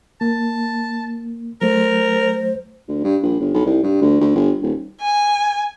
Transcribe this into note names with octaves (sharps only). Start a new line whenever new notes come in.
A#3 A5
F#3 A3 A#4 C5
D2
G2
A#1
G1
B1
C2
G2
D2
D2
G1
D#1
G#5